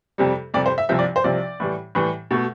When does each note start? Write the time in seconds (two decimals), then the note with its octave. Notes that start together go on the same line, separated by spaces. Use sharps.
0.18 F2 C3 G3
0.54 F2 C3 G3 D5
0.66 C5
0.78 E5
0.89 C2 C3 F3 E5
0.99 D5
1.16 C5
1.24 C2 C3 F3 D5
1.60 A2 E3 G3
1.95 A2 E3 G3
2.31 B2 A3